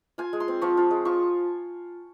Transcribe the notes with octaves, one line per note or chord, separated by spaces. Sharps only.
F4 G#5
G#3
C6
C4
F3 C#6
F4
G#3
F3 C#6